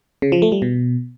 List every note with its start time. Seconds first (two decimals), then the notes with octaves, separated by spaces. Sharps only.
0.22 C#3
0.32 F3
0.42 A3
0.52 G3
0.62 B2